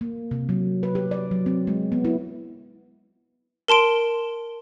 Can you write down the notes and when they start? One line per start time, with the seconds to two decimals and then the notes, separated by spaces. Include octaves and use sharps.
0.01 A#3
0.31 C3
0.49 F#3
0.83 B4
0.95 G4
1.11 D5
1.31 F#3
1.46 C4
1.67 G#3
1.92 B3
2.05 E4
3.68 A#4 A5 C6 D7